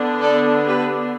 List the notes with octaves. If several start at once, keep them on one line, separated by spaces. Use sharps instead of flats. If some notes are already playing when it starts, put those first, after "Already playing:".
Already playing: D3 B3 D4
A4 D5
G4 B4